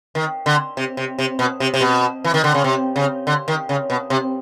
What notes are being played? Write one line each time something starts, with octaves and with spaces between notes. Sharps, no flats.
D#3
D3
C3
C3
C3
B2
C3
C3
B2
E3
D#3
D3
C#3
C3
C#3
D3
D#3
C#3
B2
C3